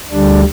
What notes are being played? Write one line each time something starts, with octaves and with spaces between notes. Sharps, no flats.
D2 D3 G3 D4